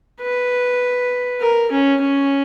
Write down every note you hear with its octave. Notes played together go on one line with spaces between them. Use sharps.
B4
A#4
C#4
C#4